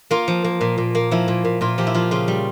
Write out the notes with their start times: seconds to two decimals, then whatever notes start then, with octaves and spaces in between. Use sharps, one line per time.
0.11 A#3 F4
0.28 F3
0.44 A#3
0.61 A#2
0.78 A#2
0.95 A#3
1.11 F3 E4
1.28 A#2
1.45 A#2
1.61 A#2 F4
1.78 F3 G4
1.87 E4
1.94 F3 F4
2.11 C#3 F4
2.28 G3